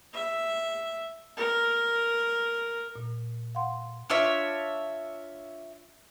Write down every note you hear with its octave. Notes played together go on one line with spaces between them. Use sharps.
E5
A#4
A#2
F5 F#5 C6
D4 F4 C#5 E5